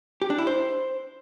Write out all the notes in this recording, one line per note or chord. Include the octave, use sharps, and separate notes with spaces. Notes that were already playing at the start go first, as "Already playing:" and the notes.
G4
D4
E4
C5